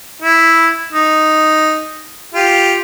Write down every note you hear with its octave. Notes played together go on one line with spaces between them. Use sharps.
E4
D#4
F4 G4